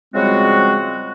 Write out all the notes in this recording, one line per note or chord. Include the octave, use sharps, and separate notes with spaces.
C#3 F3 G3 G#3 C4 F#4